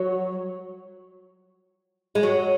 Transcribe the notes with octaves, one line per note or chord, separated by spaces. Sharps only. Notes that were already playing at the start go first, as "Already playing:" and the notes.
Already playing: F#3
G#3
F#3